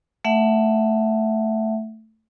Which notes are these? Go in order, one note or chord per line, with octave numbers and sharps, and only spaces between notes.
A3 E5 F#5